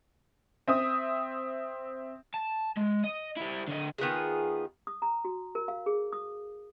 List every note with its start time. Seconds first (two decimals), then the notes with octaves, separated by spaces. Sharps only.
0.68 C4 E5 D#6
2.34 A5
2.77 G#3
3.04 D#5
3.36 G3 E4
3.68 D3 D#5
3.98 D#3 B3 F4 G#4
4.87 D#6
5.02 A#5
5.25 F#4
5.55 A#4
5.68 F5
5.86 G#4
6.13 D#6